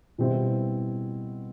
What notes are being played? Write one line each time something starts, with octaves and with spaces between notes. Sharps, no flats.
B2 G3 C4 E4